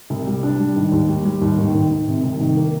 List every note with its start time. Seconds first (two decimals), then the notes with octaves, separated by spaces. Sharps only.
0.10 C2
0.27 G3
0.43 D4
0.60 G3
0.76 D#3
0.92 D#2
1.09 G3
1.25 G3
1.42 D#2
1.58 D#3
1.74 D#3
1.91 D#3
2.08 C3
2.23 C2
2.40 D#3
2.57 A#3